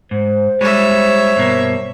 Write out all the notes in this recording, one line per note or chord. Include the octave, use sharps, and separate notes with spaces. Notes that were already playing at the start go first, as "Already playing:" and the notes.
G#2 C5
G3 G#3 C#5 E5
G2 B2 A#3